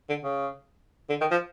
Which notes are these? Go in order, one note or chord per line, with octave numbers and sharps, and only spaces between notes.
D3
C#3
D3
D#3
F3